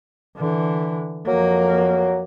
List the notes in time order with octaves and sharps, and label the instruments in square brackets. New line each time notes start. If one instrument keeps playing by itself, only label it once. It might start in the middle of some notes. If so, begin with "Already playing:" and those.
[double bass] D3 E3
[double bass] F2 A#3 [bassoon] F#3